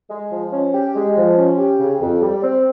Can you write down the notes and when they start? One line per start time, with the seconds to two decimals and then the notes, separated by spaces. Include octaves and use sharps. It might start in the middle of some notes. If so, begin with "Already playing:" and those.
0.10 G#3
0.31 F3
0.53 C#4
0.74 G4
0.95 G#3
1.16 F3
1.37 C#4
1.58 G4
1.79 C#3
2.01 F2
2.22 G3
2.43 C4